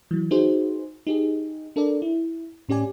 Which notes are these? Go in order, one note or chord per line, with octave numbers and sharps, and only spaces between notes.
E3 F#3
D#4 F#4 G#4 B4 C5
D#4 G4 G#4
D4 A4 A#4 D5
E4
A2 C#4 G4 D5 G#5